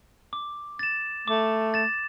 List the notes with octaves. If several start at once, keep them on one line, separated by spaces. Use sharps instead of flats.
D6
A6 E7
A3 D6
A6 E7